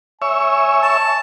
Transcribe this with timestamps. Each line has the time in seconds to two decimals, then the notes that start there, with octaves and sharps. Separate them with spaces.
0.22 C#5 E5 G#5
0.82 A5